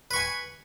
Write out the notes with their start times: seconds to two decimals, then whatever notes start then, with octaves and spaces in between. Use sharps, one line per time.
0.11 B4
0.13 C#6
0.16 G#5